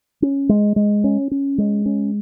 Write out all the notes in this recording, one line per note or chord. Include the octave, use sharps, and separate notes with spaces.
C#4
G#3
G#3
C#4
C#4
G#3
C#4